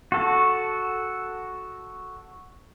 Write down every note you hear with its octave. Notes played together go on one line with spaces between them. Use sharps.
F#4 A4